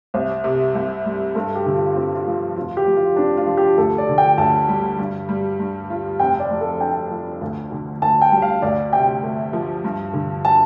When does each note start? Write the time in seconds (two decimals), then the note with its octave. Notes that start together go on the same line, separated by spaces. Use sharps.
0.14 C2 C5
0.44 C3
0.75 C2
1.06 G3
1.35 G2 A4
1.55 G4
1.66 D3
1.76 F4
1.95 C4 F4
2.16 F4
2.27 F3
2.56 F1 F4
2.77 G4
2.87 F2
2.96 F4
3.16 C4 D4
3.37 F4
3.47 F3
3.57 G4
3.78 D2 A4
3.98 D5
4.09 D3
4.18 G5
4.38 D2 A5
4.69 G3
4.99 G2
5.29 G3
5.60 G2
5.90 F4
6.20 F1 G5
6.40 D5
6.51 F2
6.61 A4
6.80 D4 G5
7.11 F3
7.41 D2
7.72 D3
8.02 D2 A5
8.21 G5
8.32 G3
8.42 F5
8.62 D2 D5
8.93 C3 G5
9.23 A3
9.53 F3
9.84 G2
10.13 D3
10.45 A5